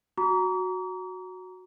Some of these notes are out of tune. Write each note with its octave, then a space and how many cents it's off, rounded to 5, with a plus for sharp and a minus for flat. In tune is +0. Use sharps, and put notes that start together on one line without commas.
F#4 -5 A#5 +0 D6 -45